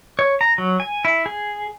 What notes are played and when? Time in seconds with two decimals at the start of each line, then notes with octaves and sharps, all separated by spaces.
0.19 C#5
0.41 A#5
0.58 F#3
0.80 G#5
1.05 E4
1.26 G#4